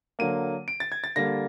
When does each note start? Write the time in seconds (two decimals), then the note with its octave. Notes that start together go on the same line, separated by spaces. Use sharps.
0.19 D3 F#3 A#3 D#7
0.68 D7
0.80 A6
0.92 G#6
1.04 A6
1.16 D3 G3 A#3 A#6